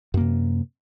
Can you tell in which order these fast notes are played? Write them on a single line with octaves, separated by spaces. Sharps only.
F#2 A#3 C3